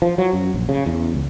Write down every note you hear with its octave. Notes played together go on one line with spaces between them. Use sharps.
F3
F#3
F#2
A#1
C#3
E2
C#2